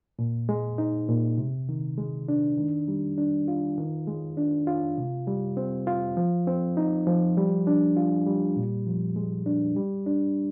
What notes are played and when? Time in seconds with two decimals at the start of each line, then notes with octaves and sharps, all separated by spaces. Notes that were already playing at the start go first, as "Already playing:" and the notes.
0.19 A#2
0.49 G#3
0.78 D#4
1.08 A#2
1.38 C3
1.69 D#3
1.98 G#3
2.28 D4
2.58 D#3
2.88 G3
3.18 D4
3.48 F4
3.78 D#3
4.07 G#3
4.37 D4
4.67 F4
4.98 C3
5.27 G3
5.57 C4
5.87 F4
6.17 F3
6.47 C4
6.77 D#4
7.07 F3
7.37 G3
7.67 D4
7.97 F4
8.27 G3
8.56 A#2
8.87 F3
9.16 G#3
9.46 D4
9.77 G3
10.06 D4